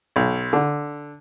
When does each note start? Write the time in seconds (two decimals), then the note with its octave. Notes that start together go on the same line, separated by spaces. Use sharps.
0.16 B1
0.53 D3